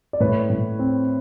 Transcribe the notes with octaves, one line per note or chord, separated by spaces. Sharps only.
D5
A2 B4 C#5
A2
C4